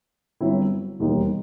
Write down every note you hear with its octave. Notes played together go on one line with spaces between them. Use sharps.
G1 G2 F#3 C4 E4
E1 D#2 D#3 G3 D#4